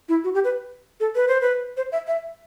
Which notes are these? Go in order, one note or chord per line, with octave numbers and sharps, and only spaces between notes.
E4
F#4
G4
B4
A4
B4
C5
B4
C5
E5
E5